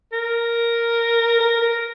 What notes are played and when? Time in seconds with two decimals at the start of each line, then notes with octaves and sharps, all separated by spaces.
0.12 A#4
1.40 A#4
1.62 A#4